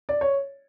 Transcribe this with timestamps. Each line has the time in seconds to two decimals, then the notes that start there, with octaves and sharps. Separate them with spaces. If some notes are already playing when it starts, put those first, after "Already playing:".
0.09 D5
0.21 C#5